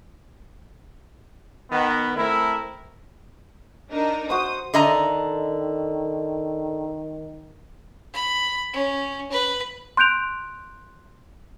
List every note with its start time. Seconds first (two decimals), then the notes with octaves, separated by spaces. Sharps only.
1.70 D#3 B3
2.16 A3 C4 E4 A4 A#4
3.90 D4 D#4 A#4
4.30 F#4 C5 D#6
4.74 D3 D#3 D#5 A#5
8.13 B5
8.73 C#4
9.31 B4
9.97 C6 F#6 G6 D7 F7